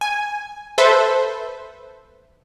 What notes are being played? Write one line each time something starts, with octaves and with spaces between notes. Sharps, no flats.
G#5
A4 B4 C5 E5